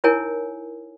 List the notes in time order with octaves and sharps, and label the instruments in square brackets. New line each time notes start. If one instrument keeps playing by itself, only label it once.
[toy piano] D#4 E4 A#4 C#5 G#5